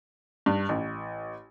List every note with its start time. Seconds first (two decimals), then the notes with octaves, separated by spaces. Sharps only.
0.46 G2
0.69 A1